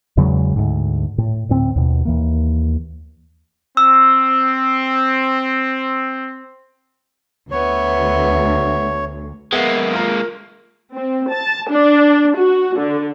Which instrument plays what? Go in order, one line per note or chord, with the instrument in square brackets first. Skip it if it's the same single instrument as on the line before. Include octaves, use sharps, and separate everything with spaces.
[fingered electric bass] E2 C#3 F#3 G#3
D2 G#2
A2
D2 A2 C4
D#2 B2
D#2 E3 A#3
[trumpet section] C4 [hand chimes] E6
[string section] D2 [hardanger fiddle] B3 E5 [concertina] C#5
[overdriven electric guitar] G#3 A#3 [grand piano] B3 E5
[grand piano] F4 A#4
[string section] C4
A5
D4
F#4
D3